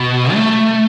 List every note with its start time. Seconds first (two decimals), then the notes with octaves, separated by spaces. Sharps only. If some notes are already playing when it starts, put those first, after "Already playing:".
Already playing: B2
0.34 A3